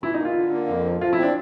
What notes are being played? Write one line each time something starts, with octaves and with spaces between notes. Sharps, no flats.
E3 E4
D#4
A#3
F4
D3
A#3
F2
F3
F3 F4
E4
C4 D4